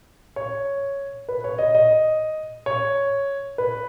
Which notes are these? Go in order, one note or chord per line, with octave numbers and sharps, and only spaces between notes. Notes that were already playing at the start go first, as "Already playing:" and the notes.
C#5
B4
C#5
D#5
D#5
C#5
B4